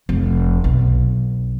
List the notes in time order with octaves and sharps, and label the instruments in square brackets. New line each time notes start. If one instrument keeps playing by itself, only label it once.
[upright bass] F1
B1